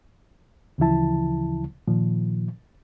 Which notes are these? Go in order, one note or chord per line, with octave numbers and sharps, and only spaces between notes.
D2 C#3 E3 F3 E4 A5
A#2 D#3 F3